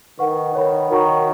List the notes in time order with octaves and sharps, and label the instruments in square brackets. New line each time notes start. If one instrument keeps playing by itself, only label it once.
[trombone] D#3 [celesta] B4 F#5 C#6
[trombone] D#3 [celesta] C#5 F#5 B5
[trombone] D#3 [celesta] F#4 C#5 F#5 A#5 C#6